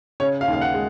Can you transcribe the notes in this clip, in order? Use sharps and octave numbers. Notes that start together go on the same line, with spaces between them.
C#3 C#5
F5
D#2
F5
F#5
G#3